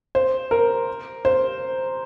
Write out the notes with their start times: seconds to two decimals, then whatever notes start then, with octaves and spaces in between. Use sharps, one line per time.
0.15 C5
0.51 A#4
1.25 C5